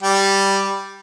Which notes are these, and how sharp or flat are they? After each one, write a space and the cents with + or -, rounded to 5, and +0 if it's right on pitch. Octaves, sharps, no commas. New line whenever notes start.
G3 +0 G5 +0